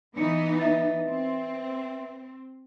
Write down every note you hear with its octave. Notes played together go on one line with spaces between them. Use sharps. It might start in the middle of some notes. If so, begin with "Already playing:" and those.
E3 B3 D#4 C#7
B4 E5 A6
C4